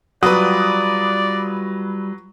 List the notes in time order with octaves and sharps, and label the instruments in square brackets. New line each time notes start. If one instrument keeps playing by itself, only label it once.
[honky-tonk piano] F#3 B4 [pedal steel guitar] G3 F4 F#5 [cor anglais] D5 [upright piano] D#6